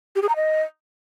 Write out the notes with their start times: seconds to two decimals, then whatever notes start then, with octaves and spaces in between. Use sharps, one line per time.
0.16 G4
0.22 G#4
0.29 A#5
0.36 D#5